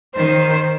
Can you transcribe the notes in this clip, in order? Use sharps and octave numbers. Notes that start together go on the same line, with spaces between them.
D#3 C5